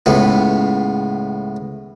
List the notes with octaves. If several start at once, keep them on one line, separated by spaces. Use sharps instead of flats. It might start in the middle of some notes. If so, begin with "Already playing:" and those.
C#2 A2 B3